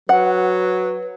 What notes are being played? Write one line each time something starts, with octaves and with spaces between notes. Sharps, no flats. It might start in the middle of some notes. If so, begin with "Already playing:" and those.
F#3 B4 F#5